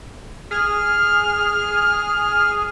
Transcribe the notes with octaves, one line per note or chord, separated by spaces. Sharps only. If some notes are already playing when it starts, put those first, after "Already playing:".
G#4 F6